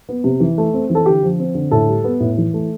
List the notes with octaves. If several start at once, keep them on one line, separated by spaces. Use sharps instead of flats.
B3
C3
E3
A3
C4
E3
A4
D3 G4
F3
C4
D3
A2 A4
G3
B3
A2
E3
A3